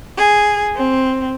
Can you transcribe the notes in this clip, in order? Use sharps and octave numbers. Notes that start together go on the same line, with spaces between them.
G#4
C4